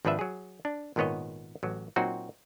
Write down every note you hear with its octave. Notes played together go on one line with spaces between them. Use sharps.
G#1 F3 D4 B4 E5
F#3 G#4
D4
G#1 A#2 D#3 B3 C#5 D#5
A1 F#3
A#2 F#3 C4 D#4 F#4